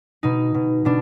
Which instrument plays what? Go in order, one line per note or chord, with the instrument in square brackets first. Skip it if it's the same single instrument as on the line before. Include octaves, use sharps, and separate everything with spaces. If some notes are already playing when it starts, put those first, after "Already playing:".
[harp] B2 D#4
B2
B2 D4